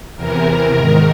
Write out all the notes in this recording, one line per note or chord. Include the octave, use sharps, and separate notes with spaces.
E2 C3 E3 A#4
G#2 D#3